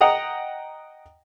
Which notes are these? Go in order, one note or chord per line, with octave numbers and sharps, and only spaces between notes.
D#5 F#5 G5 A#5 D#6